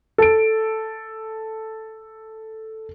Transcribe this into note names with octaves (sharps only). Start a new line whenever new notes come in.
A4 D7